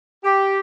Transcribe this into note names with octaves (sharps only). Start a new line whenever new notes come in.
G4